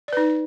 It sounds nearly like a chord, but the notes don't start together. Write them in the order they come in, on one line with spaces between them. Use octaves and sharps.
D5 B4 D#4